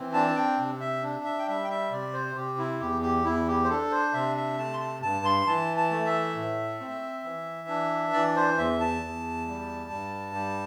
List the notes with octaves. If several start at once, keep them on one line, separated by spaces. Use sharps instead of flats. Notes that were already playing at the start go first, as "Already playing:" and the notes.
Already playing: E3 C4
D4 A5
G5
C3
E5
D4
E5
G5
G3 E5
G5
E5
C3 D5
C5
C3 G4
E4
E2 G4
G4
E2 E4
G4
C5
D4 A4
C5
C3 E5
E5
A3 A5
C6
A5
G2 A5
C6
E3 A5
A5
A3
E5
A2
C4
E3
D4
E3 D5
C5
E2 E5
A5
E2
G3
G2
G3